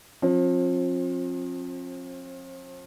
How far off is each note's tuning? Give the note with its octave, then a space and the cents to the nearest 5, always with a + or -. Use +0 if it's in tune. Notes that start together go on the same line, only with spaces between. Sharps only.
F3 +25 C4 +40